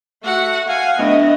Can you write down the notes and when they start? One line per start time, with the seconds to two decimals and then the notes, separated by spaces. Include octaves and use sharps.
0.24 A3 F#4 F#5
0.68 F5 F#5 G#5
0.99 A2 D3 A3 B3 D#5